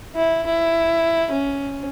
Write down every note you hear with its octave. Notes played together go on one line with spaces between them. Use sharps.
E4
E4
C#4